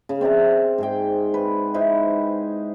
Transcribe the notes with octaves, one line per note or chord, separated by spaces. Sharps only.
C#3
C4 D5 E5 A#5
G#2 G#4 G5
B4
D#4 E4 B4 C5